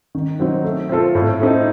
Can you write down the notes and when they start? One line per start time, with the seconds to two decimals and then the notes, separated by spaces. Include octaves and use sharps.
0.15 D#3
0.40 F#3 C4 D#4
0.64 A3
0.89 C4 F4 A4
1.15 A2
1.40 A3 C4 D#4 A4